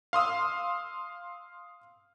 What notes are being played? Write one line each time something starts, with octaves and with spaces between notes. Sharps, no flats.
F5 C6 D#6 E6